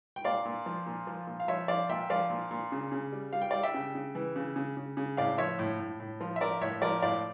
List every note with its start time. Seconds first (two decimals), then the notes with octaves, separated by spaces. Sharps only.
0.16 G5
0.24 A#2 D5 F5
0.45 A#2
0.66 F3
0.86 A#2
1.07 F3
1.27 A#2
1.40 F5
1.48 F3 C#5 E5
1.68 F3 D5 F5
1.89 A#2 E5 G5
2.10 F3 D5 F5
2.30 A#2
2.51 A#2
2.72 C#3
2.92 C#3
3.12 G3
3.33 G3 F5
3.41 G5
3.50 G3 D5 F5
3.63 E5 G5
3.74 C#3
3.95 C#3
4.15 E3
4.36 C#3
4.56 C#3
4.77 C#3
4.97 C#3
5.17 A2 D5 F5
5.38 F3 C#5 E5
5.59 A2
5.79 A2
6.00 A2
6.21 F3
6.36 E5
6.41 F3 A#4 D5
6.61 A2 C#5 E5
6.82 F3 A#4 D5
7.02 A2 D5 F5